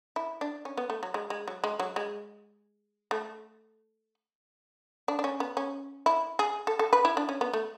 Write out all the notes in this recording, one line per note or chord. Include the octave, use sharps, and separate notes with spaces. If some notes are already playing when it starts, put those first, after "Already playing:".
E4
D4
C#4
B3
A3
F#3
G#3
G#3
F#3
G#3
F#3
G#3
A3
D4
D4
C#4
B3
C#4
E4
G#4
A4
A4
B4
E4
D4
C#4
B3
A3